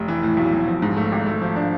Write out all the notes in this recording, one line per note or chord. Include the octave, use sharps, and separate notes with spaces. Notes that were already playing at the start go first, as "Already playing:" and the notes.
Already playing: F1
E3
A2
B1
B1
F3
G#2
A3
G#1
A3
F3
D4